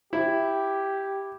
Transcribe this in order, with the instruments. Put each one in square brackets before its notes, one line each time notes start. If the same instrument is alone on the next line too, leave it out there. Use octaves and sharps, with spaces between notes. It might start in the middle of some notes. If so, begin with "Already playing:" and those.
[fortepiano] E4 [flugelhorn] G4